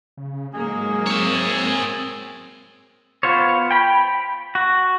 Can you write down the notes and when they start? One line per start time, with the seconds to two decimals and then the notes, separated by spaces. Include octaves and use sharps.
0.17 C#3
0.55 G#2 F#3 G#3 A#3 G#4
1.06 C4 C#5 E5
3.23 B3 F4 C5 C#5
3.71 G5 B5
4.55 F#4